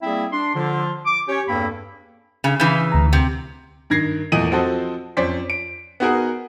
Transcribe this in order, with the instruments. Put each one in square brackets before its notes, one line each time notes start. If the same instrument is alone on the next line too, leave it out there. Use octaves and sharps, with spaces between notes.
[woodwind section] G3 A#3 C4 E4 G#4 E5
D4 C6
D3 F3 F4
D6
C#4 G4 C#5
E2 G2 A#3 C4 A4 B5
[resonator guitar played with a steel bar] C#3
[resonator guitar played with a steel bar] C#3 E3 [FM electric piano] G6
[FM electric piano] D2 A#5
[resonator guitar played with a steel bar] C3
[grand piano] G2 D#3 G#6 A#6 C7
E2 A#2 A3 D#5 D#7 F#7
F3 C4 F#4 A4 C5 D#5
F2 C#4 C5 D5 B6
D7
B3 D#4 F#4 G#4 A#4